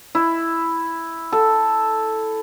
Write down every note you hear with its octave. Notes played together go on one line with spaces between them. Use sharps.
E4
A4